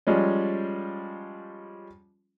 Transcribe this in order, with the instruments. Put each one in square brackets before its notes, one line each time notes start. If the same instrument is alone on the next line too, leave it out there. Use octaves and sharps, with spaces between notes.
[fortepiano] F3 G3 G#3 C#4